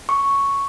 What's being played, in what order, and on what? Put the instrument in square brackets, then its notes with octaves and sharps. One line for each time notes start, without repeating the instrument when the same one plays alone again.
[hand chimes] C#6